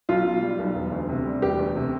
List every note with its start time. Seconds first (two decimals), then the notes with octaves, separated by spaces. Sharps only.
0.09 B1 F4
0.26 B2
0.42 G3
0.59 B1
0.75 E1
0.92 D2
1.09 C3
1.25 G3
1.41 E1 G4
1.59 D2
1.75 C3